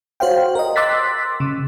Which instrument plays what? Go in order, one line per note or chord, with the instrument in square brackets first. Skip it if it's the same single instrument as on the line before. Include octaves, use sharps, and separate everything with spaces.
[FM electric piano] F#4 C5 C#5 F5 G5
A#4 D#5
C6 D6 E6 F#6 A6 B6
C#3